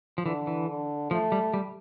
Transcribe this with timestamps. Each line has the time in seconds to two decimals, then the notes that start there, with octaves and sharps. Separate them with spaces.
0.18 F3
0.25 D3 E3
0.47 E3
0.68 D3
1.11 F3 A3
1.32 G3
1.54 G3